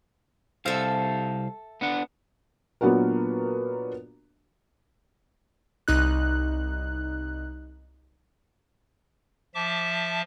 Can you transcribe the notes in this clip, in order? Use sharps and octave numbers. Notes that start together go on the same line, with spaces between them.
C2 A4 C5 E5 F5
B3 D4 F#5
A#2 F#3 B3 D4 F#4 A#4
C2 D#4 F#6
F3 E5 A5 D6